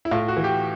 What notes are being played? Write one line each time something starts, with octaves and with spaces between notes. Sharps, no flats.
E4
A2 F4
F#4
E3
G4